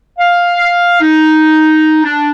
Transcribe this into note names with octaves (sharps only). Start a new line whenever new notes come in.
F5
D#4
D4